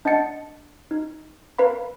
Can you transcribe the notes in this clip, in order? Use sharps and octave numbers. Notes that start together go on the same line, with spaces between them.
D4 D#5 F#5 A5 A6 C#7
D#4
A#4 B4 F5 B5